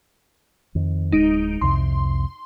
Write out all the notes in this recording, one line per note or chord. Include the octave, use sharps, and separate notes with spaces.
F2 D#3
D1 G#3 D#4 D7
C2 F2 C3 C6